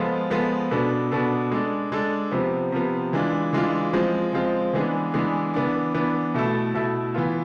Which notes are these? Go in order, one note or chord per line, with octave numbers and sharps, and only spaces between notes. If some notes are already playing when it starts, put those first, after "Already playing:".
Already playing: F3 G#3 B3 F4 A4
F3 G#3 B3 F4 A4
B2 B3 D4 A4
B2 B3 D4 A4
G#3 D4 A4
G#3 D4 A4
C3 F3 B3
C3 F3 B3
E3 G#3 D4 F4
E3 G#3 D4 F4
F3 G#3 C4 F4
F3 G#3 C4 F4
E3 G#3 B3 D4 G#4
E3 G#3 B3 D4 G#4
E3 B3 D4
E3 B3 D4
B2 A3 E4 A4
B2 A3 E4 A4
E3 B3 F4